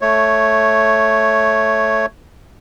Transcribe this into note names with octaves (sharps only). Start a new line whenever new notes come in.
A3 C#5